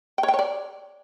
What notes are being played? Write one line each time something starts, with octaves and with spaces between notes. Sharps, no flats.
G5
C#5
G5
C#5
D5